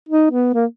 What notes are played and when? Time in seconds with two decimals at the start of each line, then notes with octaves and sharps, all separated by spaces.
0.09 D#4
0.31 B3
0.54 A#3